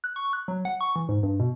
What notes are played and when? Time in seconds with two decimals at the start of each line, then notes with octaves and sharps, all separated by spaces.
0.04 F#6
0.16 C#6
0.33 F#6
0.48 F#3
0.65 F#5
0.81 C#6
0.96 E3
1.09 G#2
1.23 G2
1.40 B2